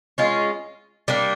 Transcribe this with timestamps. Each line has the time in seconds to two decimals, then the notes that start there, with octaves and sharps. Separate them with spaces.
0.18 G#3 C#4 F4
1.08 G3 A#3 D4